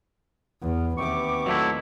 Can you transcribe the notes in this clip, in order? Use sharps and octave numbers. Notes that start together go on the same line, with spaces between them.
E2 B3
D#2 C3 B3 G4 C#6 D6
A#2 F#3 A3 E4 D#5 C6